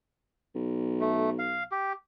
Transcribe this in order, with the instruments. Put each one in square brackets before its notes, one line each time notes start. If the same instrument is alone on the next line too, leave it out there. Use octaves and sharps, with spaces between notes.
[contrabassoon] B1
[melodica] A3
F5
G4